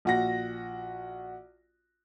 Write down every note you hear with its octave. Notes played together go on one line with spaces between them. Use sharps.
A#1 F#4 A#6